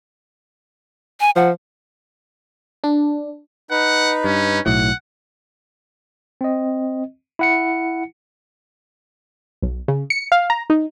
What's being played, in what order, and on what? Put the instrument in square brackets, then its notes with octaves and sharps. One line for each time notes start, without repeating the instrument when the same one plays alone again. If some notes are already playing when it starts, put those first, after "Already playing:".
[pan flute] G#5
[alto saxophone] F3 [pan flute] F#5
[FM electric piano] D4
[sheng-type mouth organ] D#4 B4 [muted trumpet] F#5
[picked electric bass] G2 [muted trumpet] C#4
[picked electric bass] B1 A2 [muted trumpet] F#5
[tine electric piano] C4 D#5
E4 F#5 C#7
[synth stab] B1
C#3
C#7
F5
A#5
D#4